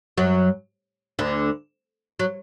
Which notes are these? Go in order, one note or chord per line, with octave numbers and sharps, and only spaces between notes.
F#2 F#3
D2 D3
F#3